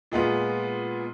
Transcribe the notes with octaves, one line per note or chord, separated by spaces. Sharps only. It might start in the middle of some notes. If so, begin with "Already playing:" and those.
A#2 G#3 B3 F4